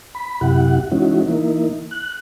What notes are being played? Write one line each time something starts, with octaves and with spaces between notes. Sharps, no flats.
B5
F#2 C3 E4 G4 F#5
E3 G#3 C#4 D#4 E4 F#4
E3 A#3 D#4 E4
F#6